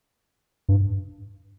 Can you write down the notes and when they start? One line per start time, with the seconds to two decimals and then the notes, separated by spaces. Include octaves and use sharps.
0.69 G2